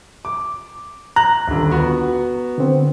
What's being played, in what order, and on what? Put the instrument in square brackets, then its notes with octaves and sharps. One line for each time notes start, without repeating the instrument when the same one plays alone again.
[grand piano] D6
[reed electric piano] A#5 [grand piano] F#6
[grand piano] D#1 D3
B3 F#4
[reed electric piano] D3 C4